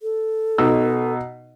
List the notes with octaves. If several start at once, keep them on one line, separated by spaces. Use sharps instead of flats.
A4
B2 D#4 E6